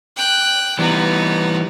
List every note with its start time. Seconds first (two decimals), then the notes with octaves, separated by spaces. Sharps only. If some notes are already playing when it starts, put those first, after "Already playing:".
0.17 G5 F#6
0.79 E3 G3 B3 D#4